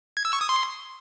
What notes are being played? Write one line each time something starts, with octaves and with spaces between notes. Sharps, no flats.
G#6
E6
C#6
D#6
C6